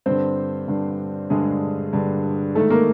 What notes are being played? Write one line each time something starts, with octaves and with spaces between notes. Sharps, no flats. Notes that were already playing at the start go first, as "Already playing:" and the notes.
G2 D3 C4 C5
G2 D3
G2 D3 G#3 G#4
G2 D3
G#2 D#3 A3 A4
A#3 A#4